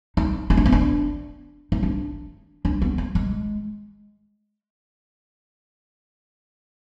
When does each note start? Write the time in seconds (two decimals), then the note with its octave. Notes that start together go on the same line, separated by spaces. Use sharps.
0.17 D#4
0.50 D#4
0.57 D4
0.66 B3
0.72 D4
1.72 D#4
1.83 D4
2.65 D4
2.82 B3
2.98 A#3
3.15 G#3